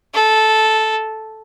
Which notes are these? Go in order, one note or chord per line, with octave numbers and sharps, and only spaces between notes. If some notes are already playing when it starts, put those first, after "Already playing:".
A4